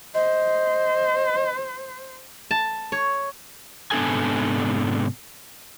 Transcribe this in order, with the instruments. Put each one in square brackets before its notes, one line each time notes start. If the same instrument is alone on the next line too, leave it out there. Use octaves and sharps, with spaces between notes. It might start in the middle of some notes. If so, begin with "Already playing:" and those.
[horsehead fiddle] C5 [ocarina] D#5
[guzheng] A5
C#5
[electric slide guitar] G#2 C3 B3 D4 A4 G#5